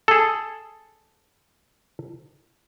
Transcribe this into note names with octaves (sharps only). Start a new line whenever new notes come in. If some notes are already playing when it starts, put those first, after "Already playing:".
G#4 A4